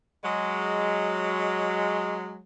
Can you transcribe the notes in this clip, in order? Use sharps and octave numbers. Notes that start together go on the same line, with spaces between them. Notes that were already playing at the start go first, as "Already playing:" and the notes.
F#3 G#3